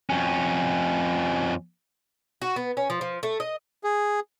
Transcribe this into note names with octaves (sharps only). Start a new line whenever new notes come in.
F2 C#4
F#4
B3
C#4
F3
F3
A3
D#5
G#4